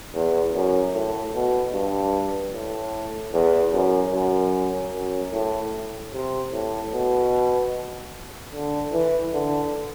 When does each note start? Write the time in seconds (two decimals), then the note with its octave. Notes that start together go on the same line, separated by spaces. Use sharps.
0.14 E2
0.53 F#2
0.94 A2
1.34 B2
1.73 G2
2.54 A2
3.33 E2
3.73 F#2
4.13 F#2
4.93 F#2
5.34 A2
6.13 C3
6.53 A2
6.93 B2
8.53 D3
8.93 E3
9.33 D3